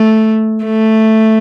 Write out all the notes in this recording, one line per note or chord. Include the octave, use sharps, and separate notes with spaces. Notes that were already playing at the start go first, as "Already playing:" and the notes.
Already playing: A3
A3